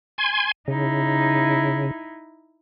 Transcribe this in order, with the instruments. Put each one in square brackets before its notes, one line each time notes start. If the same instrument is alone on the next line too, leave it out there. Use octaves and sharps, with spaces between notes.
[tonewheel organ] G#5 C6 G#6
[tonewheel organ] C#3 [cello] D#4 E4